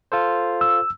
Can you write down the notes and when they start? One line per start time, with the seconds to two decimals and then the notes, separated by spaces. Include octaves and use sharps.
0.12 F4 A4 C5
0.61 E6